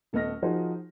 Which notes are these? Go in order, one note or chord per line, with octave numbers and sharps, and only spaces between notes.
D#1 A3 B3 D#5 F6 A#6
F3 D#4 F#4 G#4 A#4 C5